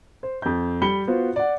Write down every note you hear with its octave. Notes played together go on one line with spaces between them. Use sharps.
C5
F2 G6
G3 B5 C#7 G7
B3 F4 F#4 C5
D5 F#5